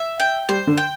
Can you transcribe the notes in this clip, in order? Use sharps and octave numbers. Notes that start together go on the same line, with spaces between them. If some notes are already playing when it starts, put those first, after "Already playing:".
Already playing: E5
G5
G3 C5
D3
G5